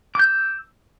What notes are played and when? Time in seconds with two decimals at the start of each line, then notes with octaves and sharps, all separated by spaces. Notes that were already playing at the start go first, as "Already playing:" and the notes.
0.15 D6
0.19 G6
0.24 E6